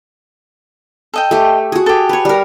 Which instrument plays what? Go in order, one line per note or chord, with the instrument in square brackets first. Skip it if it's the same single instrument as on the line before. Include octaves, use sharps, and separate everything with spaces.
[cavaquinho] A4 D#5 G5
[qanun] A3 G4
F#4 G#4
[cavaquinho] G4 A4
[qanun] B4 C#5
G3 A#4